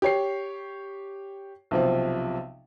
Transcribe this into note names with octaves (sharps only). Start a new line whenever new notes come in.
G4 C#5 C7
B1 C3 F3